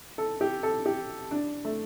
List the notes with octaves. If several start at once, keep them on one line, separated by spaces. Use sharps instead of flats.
A4
G4
A4
G4
D4
A3